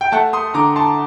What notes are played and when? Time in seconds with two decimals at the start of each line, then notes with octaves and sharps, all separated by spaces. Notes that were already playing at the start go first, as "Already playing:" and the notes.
0.01 G5
0.12 A3 F#5 A5
0.33 C6 D#6
0.54 D3 A#5 D6
0.76 A5 C6